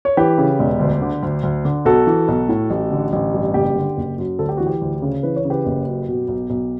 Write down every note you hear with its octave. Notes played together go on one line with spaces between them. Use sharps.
C#5
E3 G4 B4
C#3
E1
D2
D3
D2
D2
D3
B1 F#4 A4
E3
B1
A2
A1
D3
A1
G2
F#1 G4
D3
F#1
F#2
D2 A4
G4
E3 F#4
G4
D2
C#3
E3 B4
C#5
C#3
G4 B4
F#1
F#2
B2
B1
B1